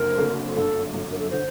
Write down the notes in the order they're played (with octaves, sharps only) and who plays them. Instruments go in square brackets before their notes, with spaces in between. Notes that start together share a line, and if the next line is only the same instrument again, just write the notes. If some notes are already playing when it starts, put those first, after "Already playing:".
Already playing: [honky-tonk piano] F#1 F#2 D3 C4 [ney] A#4
[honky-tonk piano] F#1 F#2 D3 A3 C4
[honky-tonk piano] G1 F#2 D3 [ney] A4
[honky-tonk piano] G1 F#2 D3
[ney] A#4
A4
[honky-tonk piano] D3 [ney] C5